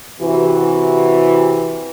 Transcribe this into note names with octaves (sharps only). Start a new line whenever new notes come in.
C3 E3 F#4